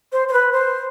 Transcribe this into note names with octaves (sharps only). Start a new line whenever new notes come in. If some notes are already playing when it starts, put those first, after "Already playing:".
C5
C5
B4
C5